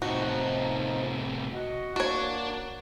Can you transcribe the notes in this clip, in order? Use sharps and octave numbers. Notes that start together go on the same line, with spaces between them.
A2 C3 F3 D#4 F#4
F#4 D#5 F#5
A#3 D4 F#4 C#5